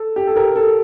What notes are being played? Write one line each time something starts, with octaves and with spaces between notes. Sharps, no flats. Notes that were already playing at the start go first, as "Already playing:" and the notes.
Already playing: A4
G4
A4
G4 A#4
A4